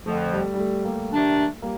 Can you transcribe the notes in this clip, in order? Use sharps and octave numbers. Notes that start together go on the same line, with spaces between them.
F2 D3 F3 A3
G3
G3
A3
G3 A#3
C3 D#3 A3 D4
G3 A#3